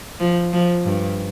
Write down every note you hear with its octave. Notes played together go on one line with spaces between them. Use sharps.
F3
F3
G2